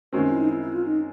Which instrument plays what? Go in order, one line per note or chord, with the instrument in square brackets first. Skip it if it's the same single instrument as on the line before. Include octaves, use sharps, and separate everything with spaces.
[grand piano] F#2 D#3 G#3 C4 [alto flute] F#4
[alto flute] E4
D#4
E4
E4
F4
D#4